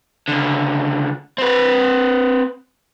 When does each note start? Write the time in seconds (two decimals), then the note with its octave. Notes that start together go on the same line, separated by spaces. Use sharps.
0.28 C#2 D3
1.38 C4 B4